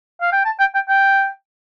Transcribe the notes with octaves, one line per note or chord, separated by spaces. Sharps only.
F5
G5
A5
G5
G5
G5